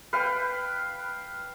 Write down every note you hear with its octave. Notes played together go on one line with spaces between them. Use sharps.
B4 F5 G5